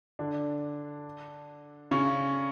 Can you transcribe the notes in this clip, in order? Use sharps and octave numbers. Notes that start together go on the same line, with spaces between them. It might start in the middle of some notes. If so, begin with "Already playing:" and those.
D3 D4
C#3 C#4